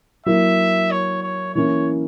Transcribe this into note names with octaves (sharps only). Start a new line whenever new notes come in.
F#3 A#3 E4 E5
C#5
C#5
E3 A#3 C#4 E4 C#5